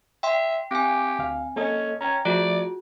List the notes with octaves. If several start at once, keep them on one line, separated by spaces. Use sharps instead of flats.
E5 G5 C6
C4 G4 G#5
D2 F5
A#3 C#4 A4 D#5
C#4 G5 A#5
F3 A3 F4 F#4 G#4 D5